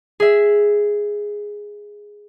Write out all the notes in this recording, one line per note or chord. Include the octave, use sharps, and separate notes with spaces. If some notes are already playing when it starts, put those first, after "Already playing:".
G#4 E5